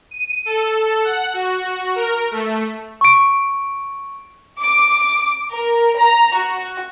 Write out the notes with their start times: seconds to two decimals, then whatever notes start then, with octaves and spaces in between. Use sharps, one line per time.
0.11 D#7
0.46 A4
1.04 F#5
1.34 F#4
1.96 A#4
2.31 A3
3.01 C#6 D7
4.60 D6
5.50 A#4
5.98 A#5
6.36 F#4